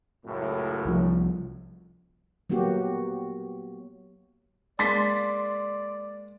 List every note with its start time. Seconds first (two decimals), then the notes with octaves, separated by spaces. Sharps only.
0.25 C#2 F#2 A2
0.85 C2 F3
2.50 F#3 A#3 B3 F#4 G4
4.79 G#3 A#3 D5 C6 A6 B6